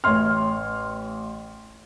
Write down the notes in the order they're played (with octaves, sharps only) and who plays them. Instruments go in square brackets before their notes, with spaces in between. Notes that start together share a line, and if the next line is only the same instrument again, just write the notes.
[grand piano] A1 C#5 E5 C6 F6